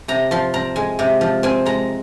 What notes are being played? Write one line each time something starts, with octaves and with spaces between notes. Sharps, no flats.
C3 A#5
F3 C6
C4 A#5
G#3 G#5
C3
F3
C4 G#5
G#3 A#5